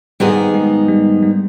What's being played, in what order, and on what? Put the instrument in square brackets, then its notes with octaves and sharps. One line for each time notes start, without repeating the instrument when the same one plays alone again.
[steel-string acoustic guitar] G#2 D#3 B3 D#4 G#4 [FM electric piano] G3
[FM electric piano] G#3
G3
G3